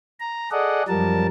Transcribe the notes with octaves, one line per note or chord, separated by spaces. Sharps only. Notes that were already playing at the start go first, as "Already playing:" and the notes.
A#5
G#4 A4 D5 D#5 F#5
F#2 F3 G3 A#4 A5